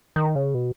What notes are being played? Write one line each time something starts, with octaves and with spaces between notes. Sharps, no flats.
D#3
C#3
B2